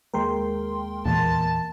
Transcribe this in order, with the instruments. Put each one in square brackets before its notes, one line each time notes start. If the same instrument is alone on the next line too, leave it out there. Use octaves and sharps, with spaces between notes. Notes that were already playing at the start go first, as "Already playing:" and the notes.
[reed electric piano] D#2 G#3 A#3 [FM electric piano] A#4 G5 C6
[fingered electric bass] E2 A#2 [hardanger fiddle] A5